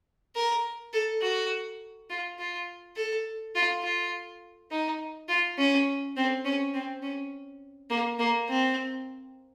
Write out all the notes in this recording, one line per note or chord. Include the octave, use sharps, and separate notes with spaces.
A#4
A4
F#4
F4
F4
A4
F4
F4
D#4
F4
C#4
C4
C#4
C4
C#4
A#3
A#3
C4